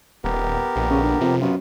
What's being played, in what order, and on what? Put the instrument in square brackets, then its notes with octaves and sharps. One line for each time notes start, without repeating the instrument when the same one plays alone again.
[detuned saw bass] D#1 [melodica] B3 G4 A#4
[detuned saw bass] A#1
[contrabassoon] C#3
D3
[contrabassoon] F2 [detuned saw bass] C3
[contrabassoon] F#2 [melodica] B3 F4